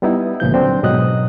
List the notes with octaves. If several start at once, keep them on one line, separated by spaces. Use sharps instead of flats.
G3 B3 D#4 E4
C#2 A#2 F3 G6
D3 F#3 C4 D4
G#2 B2 F#3 D#5 D#6 F#6